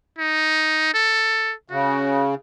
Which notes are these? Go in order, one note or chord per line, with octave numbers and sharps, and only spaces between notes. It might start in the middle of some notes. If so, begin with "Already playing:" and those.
D#4
A4
C#3 F#4